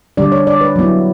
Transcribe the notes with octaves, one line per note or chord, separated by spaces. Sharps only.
D3 G3 D4 D5
C#5
D5
B4
F#3 B3 E4